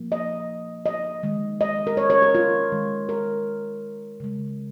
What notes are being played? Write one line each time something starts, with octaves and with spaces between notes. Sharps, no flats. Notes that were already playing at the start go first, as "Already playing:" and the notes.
Already playing: A#2 F3 A#3
D#5
D#5
D#3 G#3
D#5
A#4
C#5
C#5
A#4
F4
D#3 G#3
A#4
C#3 G#3